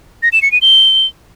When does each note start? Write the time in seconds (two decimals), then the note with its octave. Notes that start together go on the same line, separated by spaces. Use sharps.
0.23 A#6
0.32 E7
0.42 C#7
0.52 D#7
0.62 G7